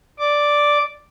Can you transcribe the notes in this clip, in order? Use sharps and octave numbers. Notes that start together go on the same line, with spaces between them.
D5 D6